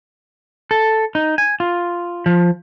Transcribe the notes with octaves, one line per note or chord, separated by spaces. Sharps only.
A4
D#4
G#5
F4
F3